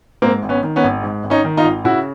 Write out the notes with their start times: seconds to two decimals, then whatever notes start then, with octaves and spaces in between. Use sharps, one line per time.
0.22 G#2 A#3 C4
0.43 G#1
0.49 B3 C#4
0.63 D#3
0.76 B3 C#4
0.84 G#1
1.03 G#2
1.24 G#1
1.30 C#4 D#4
1.45 D#3
1.57 D#4 F4
1.64 G#1
1.84 C#3 E4 F#4